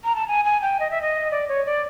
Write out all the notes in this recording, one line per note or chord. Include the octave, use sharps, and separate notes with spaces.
A#5
A5
G#5
G#5
G5
D#5
E5
D#5
D5
C#5
D5